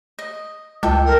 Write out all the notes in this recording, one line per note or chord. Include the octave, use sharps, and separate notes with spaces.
D#5
C#2 A4 G5
A#4